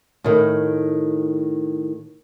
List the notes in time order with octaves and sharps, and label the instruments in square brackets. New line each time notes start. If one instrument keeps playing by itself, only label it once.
[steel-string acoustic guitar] A2 D#3